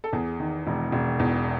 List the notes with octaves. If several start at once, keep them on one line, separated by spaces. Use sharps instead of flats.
A4
E2 G#4
D#3
E1
E1
E2